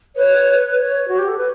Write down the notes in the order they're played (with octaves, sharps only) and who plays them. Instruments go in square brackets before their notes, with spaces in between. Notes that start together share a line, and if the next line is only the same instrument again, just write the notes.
[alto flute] B4 [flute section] C#5
[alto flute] C#5
F#4
G4
A4
B4